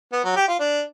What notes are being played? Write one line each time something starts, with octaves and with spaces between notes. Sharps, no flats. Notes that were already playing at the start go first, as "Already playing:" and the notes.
B3
F#3
G4
F4
D4